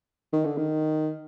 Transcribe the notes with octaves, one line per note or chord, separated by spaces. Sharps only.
D#3
D3
D#3